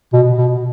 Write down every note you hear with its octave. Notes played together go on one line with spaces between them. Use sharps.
B2
B2